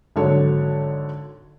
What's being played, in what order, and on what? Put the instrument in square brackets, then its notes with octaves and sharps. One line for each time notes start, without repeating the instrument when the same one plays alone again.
[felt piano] G#1 D3 F#3 D4 A4 C#5